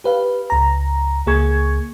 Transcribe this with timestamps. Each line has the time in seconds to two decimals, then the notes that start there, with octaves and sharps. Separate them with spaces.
0.04 G4 B4 F5
0.50 C#2 A#5
1.26 C#2 A#3 G#4 C#6 G#6